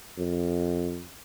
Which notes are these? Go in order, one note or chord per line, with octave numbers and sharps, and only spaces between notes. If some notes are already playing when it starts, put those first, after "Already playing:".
F2